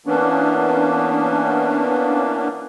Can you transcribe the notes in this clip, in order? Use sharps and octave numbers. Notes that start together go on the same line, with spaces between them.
E3 A#3 B3 C#4 D4